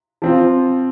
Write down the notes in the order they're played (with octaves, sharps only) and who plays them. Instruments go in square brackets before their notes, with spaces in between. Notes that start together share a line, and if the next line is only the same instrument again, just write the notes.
[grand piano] F3 C4 F4